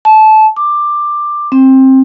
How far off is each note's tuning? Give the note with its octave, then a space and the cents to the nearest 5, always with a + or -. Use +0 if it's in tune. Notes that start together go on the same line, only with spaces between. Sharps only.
A5 -20
D6 +15
C4 +20